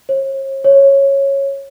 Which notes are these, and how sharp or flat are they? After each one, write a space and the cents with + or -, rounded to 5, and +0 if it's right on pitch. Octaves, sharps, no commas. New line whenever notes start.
C#5 -45
C#5 -10